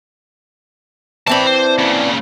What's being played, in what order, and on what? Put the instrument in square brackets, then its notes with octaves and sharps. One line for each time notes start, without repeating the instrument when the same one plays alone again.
[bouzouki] E3 C4 D4 [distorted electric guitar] A5 B5
[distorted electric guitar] C5
A#2 C#3